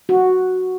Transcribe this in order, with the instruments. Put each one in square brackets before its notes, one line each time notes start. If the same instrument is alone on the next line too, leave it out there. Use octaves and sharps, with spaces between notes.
[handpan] F#4